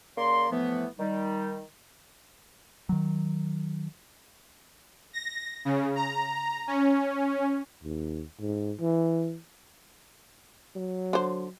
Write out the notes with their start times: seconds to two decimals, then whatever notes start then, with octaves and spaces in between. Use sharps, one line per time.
0.18 C#3 A#3 D5 C6
0.51 A2 E3 F3 A3 B3
0.99 D#3 G3 D#4
2.89 D#3 F#3
5.13 A#6
5.65 C#3
5.96 A#5
6.67 C#4
7.84 D#2
8.40 G#2
8.80 E3
10.75 F#3
11.13 D3 C5